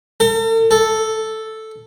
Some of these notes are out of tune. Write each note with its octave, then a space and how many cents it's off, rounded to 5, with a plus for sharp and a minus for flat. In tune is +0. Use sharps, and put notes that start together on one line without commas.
A4 +45
A4 +0